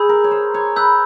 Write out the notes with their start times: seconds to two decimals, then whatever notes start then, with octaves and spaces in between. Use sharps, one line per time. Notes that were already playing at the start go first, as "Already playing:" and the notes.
Already playing: G#4 B5 E6 G6
0.09 A#4
0.24 C#5
0.31 C5
0.54 C#5
0.76 B4 B5 E6 G6